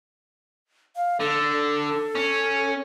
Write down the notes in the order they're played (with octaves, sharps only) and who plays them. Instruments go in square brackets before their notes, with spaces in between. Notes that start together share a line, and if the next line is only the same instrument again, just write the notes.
[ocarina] F5
[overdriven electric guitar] D3 [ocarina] A4
[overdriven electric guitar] C#4